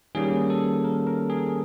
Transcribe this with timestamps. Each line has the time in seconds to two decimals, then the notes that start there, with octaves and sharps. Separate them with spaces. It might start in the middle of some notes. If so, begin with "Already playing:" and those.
0.15 D#3 G3 A#3 C#4 G#4
0.50 A4
0.84 A#4
1.07 A#4
1.30 G#4